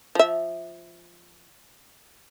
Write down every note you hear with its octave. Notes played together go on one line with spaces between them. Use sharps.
F3 E5